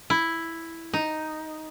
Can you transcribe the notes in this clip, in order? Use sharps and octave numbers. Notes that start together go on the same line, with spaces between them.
E4
D#4